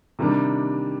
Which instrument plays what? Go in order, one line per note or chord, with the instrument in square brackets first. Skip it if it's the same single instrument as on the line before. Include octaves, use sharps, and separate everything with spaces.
[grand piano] C3 D#3 G3 D4